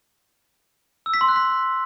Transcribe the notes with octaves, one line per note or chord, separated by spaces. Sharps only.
E6
B6
C6
F#6
B6